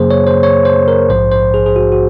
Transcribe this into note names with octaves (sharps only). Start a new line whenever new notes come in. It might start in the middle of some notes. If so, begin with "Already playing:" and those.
Already playing: F#2 C#3 F#3 A#3 G#4 C5
C#5
C5
C#5
C5
A#4
A#1 G#2 F3 C5
C5
G#4
G#4
F#4
F#4